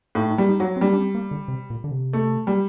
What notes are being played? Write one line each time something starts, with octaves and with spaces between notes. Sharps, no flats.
A2 D#4
D#4
G3
D#4
F#3
C4
G3 D4
D4
C4
A#3
D3
C3
A#2
D3
C3
A3
G3